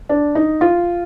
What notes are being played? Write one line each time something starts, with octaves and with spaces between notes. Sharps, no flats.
D4
D#4
F4